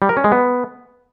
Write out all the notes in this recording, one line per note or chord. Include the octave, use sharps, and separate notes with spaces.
G3
A#4
C#4
G#3
B3